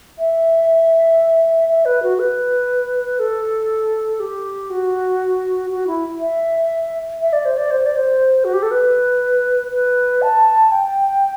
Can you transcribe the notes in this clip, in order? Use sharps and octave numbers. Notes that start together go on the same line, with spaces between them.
E5
E5
B4
F#4
B4
A4
G4
F#4
F#4
E4
E5
E5
D5
C5
D5
C5
D5
C5
F#4
G4
A4
B4
B4
A5
G5